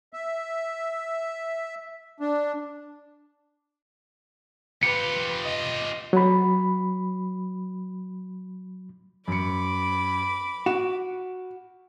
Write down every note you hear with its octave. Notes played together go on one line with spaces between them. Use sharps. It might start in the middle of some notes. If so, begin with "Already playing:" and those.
E5
D4
F4 G4 B4 C#7
D#5
F#3 B5
F#2 B5 D6 C#7
F#4 E7